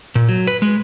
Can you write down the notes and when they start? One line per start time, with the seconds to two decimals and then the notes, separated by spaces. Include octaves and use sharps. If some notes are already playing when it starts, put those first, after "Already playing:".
0.15 A#2
0.29 F#3
0.47 B4
0.62 G#3